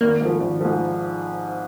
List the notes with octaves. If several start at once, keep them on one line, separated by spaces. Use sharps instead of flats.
G#1 A#3
G#2 F3
G#1
G#2 F3